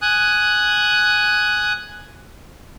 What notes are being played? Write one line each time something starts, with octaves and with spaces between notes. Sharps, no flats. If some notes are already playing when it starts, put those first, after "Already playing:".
G#5 D#6 F#6